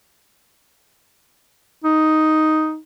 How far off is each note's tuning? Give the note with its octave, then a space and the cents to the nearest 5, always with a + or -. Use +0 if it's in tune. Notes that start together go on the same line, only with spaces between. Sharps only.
D#4 +5